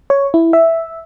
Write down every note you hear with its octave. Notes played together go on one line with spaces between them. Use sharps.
C#5
E4
E5